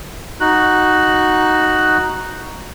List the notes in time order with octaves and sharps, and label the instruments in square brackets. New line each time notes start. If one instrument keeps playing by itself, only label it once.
[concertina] D#4 F#4 F#6